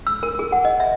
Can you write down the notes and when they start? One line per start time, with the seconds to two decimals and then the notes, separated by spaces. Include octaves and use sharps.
0.07 E6
0.23 A#4
0.39 G#4
0.52 F#5
0.65 D#5
0.80 E5